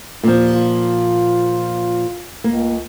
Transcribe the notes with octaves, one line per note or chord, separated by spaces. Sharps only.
D#2 A#2 F3
F4
C#2 A#3